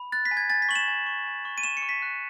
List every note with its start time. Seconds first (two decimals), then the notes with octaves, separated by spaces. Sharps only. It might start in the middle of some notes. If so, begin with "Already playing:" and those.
Already playing: B5
0.12 F#6 A6
0.25 B6
0.31 G#5
0.37 G#6
0.50 G#5 A6
0.62 B6
0.69 C#6 F#7
0.75 E7
0.88 G#5
1.07 C#6
1.27 G#5
1.45 C#6
1.58 D#7
1.63 C#6 E7
1.77 C#7
1.82 C#6
1.89 B6
2.02 F#6